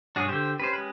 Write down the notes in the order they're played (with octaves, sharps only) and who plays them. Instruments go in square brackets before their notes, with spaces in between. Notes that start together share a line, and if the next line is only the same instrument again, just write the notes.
[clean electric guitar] B1 G2 C#5 [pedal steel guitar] D4 F#4 G#4
[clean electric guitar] D3 G4 [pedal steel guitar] C5 G5
[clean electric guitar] C#4 G4 [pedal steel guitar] B4 C5
[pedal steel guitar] G#3 B4